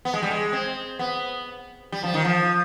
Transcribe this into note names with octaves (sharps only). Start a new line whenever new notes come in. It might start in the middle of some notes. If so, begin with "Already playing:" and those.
B3
G#3
G3
G#3
C4
B3
G3
F3
D#3
F3